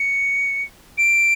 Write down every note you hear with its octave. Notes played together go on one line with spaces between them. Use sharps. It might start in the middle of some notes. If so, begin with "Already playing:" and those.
Already playing: C#7
D7